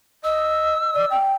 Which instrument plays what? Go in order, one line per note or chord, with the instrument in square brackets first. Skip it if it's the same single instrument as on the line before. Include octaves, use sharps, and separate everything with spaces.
[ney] D#5 [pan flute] E6
[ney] D5
G5